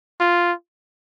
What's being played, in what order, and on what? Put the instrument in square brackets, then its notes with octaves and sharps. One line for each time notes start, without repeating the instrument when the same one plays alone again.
[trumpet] F4